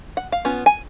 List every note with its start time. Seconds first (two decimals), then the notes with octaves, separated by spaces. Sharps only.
0.17 F#5
0.32 F5
0.45 B3 C#4 F4
0.66 G#5